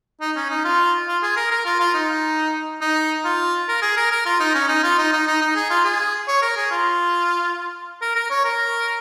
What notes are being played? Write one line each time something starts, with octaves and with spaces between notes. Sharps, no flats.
D#4
C#4
D#4
F4
F4
G#4
A#4
A#4
F4
F4
D#4
D#4
F4
A#4
G#4
A#4
A#4
F4
D#4
C#4
D#4
F4
D#4
D#4
D#4
D#4
G#4
F4
G#4
C#5
A#4
G#4
F4
A#4
A#4
C#5
A#4